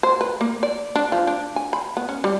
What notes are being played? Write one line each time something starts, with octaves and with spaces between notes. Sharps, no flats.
C5
B4
A#3
D5
D4
F3
D4
G#5
B5
B3
C#4
G3